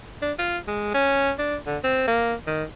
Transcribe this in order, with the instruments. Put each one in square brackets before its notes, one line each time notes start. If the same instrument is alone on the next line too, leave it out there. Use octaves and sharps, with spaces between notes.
[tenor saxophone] D4
F4
G#3
C#4
D4
D3
C4
A#3
D#3